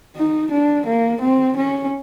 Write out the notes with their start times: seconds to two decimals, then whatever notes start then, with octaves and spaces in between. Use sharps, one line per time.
0.16 D#4
0.52 D4
0.87 A#3
1.22 C4
1.57 C#4